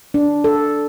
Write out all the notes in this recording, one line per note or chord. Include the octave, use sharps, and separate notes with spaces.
D4
A4